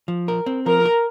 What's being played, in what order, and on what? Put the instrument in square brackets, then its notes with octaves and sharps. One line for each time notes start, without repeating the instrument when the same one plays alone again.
[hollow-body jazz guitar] F3
A#4
C4
[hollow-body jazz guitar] F3 [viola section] A#4
[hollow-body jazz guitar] A#4